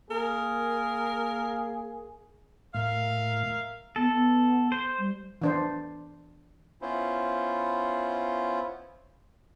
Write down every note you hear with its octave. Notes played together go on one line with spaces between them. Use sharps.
A#3 G#4 A#4
A2 A#4 E5 F5
B3 A4
B3
C5
G3
E3 D4 C5
B3 C#4 E4 F4 C5